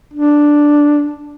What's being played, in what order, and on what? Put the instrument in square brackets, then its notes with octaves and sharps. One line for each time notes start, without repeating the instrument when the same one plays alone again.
[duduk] D4